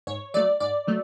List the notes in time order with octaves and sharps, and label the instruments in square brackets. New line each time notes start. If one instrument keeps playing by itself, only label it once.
[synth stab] G#2 C#5
F#3 A3 D5
G#2 D5
F#3 A3